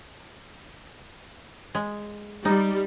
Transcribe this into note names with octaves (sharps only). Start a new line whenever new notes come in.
G#3
G3 D#4